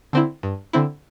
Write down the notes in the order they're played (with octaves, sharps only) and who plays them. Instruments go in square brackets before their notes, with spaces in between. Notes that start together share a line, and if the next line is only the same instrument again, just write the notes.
[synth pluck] D3 C4 E4
G2
D3 C4 E4